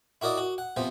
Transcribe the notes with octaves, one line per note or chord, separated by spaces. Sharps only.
E4 F#4 A#4 D5 D#5
F#4
F#5
C3 F3 B3